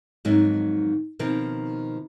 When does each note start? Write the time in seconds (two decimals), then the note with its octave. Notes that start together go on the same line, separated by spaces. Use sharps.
0.25 F2 G#2 D#3 F#3
1.19 B2 D#3 F3 C4